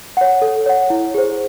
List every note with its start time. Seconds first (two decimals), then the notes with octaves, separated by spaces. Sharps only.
0.17 C#5 F#5
0.42 A4
0.66 C#5 F#5
0.90 E4
1.14 G#4 C5